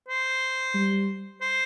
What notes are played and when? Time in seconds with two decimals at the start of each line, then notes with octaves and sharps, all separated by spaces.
0.08 C5
0.74 G3
1.41 C5